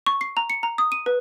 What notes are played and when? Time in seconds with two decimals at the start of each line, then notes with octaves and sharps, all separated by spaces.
0.06 C#6
0.21 C7
0.37 A#5
0.50 C#7
0.63 A#5
0.78 D#6
0.92 D#7
1.06 B4